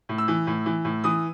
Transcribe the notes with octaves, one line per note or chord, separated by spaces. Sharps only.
A2
E6
E3
A2
E3
A2
E3 D#6